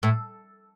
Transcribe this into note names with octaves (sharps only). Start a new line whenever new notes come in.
A2